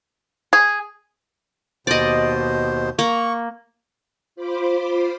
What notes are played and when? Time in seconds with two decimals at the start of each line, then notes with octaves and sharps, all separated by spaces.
0.53 G#4
1.87 D#2 B2 C5 D5 D#5
2.99 A#3 C#6
4.36 F4 C5 B5 D6